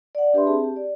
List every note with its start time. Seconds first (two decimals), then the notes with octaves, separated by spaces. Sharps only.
0.15 D5 F#5
0.34 D4 G4 B4 E5 B5 C6
0.46 C4 G#4 A5
0.64 G4
0.76 D5